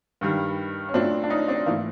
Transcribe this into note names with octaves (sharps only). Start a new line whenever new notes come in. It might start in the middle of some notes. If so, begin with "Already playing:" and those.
G2 D#3 G3
C#4
A#2 F#3 A3 C4 D4
D4
C#4 D#4
C4 D4
G#2 E3 A3 A#3